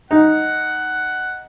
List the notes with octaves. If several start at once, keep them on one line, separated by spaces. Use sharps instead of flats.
D#4 F#5